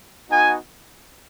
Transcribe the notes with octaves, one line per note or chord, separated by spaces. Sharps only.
B3 D#4 F#4 G#5